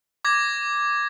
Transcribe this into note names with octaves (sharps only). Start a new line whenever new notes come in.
D6 G#6 A#6